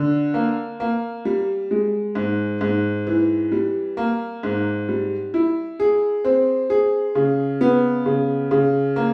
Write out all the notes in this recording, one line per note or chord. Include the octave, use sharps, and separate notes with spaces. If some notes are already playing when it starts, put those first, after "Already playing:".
Already playing: D3
A#3
A#3
G3
G#3
G#2
G#2
E3
G3
A#3
G#2
G3
E4
G#4
C4
G#4
C#3
B3
C#3
C#3
A#3